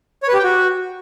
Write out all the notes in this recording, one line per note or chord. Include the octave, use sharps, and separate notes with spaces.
C#5
B4
G4
G5
F#4